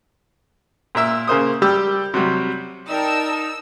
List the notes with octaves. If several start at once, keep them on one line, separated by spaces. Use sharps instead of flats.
A#2 A#4 E5 E6
C#3 A#3 C5 D#6
G3 G4 E6
C3 F#3 G3
D#4 A#4 D5 G5 A5 E6